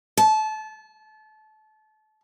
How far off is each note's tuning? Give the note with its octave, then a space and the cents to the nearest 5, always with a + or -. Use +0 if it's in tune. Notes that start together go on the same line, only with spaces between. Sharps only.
A5 -25